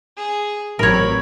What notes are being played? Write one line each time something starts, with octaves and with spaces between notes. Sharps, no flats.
G#4
A1 F#3 C4 A#4 C#5 B5